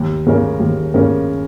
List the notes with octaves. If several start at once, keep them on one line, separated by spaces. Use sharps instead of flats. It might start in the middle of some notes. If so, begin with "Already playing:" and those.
Already playing: D#2
C#3 A#3 C#4 A#4
D#2
C#3 A#3 C#4 A#4